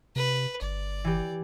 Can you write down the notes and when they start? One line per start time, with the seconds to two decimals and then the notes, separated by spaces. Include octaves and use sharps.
0.16 C3 B4
0.62 G1 D5
1.04 E3 G4